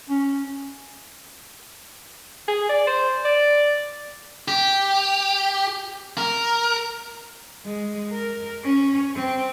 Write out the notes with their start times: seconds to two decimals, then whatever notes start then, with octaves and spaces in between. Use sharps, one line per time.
0.10 C#4
2.48 G#4
2.69 D5
2.87 C5
3.25 D5
4.48 G4
6.18 A#4
7.65 G#3
8.12 A#4
8.63 C#4
9.15 C4